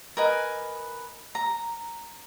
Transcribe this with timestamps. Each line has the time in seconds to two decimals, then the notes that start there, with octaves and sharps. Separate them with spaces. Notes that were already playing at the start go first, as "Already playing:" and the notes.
0.17 A#4 B4 D#5 G#5
1.35 A#5